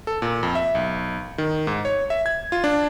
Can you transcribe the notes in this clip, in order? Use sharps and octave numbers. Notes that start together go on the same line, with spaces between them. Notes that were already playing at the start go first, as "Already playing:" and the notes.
A4
A#2
F2
E5
B1
D#3
G#2
C#5
E5
G#6
F4
D4